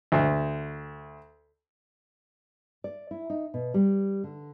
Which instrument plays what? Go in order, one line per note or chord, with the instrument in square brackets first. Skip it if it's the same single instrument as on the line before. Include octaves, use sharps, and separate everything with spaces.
[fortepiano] D2
[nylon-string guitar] D5
E4
D#4
B2
G3
D3